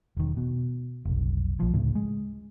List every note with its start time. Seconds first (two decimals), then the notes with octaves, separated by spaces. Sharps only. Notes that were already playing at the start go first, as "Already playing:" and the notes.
0.17 E1 D#3
0.37 B2
1.05 F1 B1
1.60 A#1 F3
1.73 D2 A2 C#3
1.95 G#3